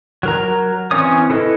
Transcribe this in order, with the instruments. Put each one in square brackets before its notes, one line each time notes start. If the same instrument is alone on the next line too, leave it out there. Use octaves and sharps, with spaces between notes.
[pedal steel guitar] F#3 A#4 A#5
E3 C4 C#4 C#5 D#6
E4 A4 B4 D#5